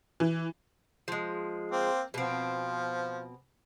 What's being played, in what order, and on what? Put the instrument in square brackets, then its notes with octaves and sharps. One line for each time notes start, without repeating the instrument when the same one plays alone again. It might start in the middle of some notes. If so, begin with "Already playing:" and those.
[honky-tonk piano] E3
[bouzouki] F3 G#3
[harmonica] A#3 C4
[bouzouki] B2 C4 [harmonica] F3